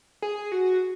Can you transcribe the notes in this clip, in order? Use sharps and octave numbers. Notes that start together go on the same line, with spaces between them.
G#4
F#4